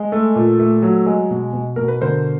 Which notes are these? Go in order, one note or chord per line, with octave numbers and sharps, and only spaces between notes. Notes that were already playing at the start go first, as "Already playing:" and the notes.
Already playing: G#3
A3
A#2
A3
F#3
G#3
B2
B2
B2 A#4
B4
D3 A#4 C5